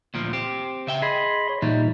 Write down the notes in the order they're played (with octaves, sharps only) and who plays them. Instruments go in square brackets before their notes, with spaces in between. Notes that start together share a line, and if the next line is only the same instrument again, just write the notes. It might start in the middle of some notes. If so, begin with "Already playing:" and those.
[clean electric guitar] D2 A#2 F3
C4 G4
C#3 E5 G5
[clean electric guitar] G#4 [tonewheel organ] D#5 B5 C6
[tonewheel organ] C#5
[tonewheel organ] A#2 D#4 [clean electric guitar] E3 G3